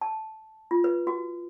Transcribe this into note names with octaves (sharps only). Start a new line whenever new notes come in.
A5
F4
B4
F#4